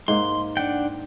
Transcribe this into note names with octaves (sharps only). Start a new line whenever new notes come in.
G#2 A#3 C6
D4 F#5 G5